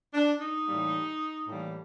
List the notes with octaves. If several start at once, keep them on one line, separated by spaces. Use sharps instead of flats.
D4
D#4
A2 E3 G3 A#3
A2 E3 G3 A#3